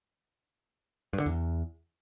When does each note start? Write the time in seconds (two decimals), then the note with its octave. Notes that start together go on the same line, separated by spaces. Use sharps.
1.13 G2
1.20 D3
1.26 E2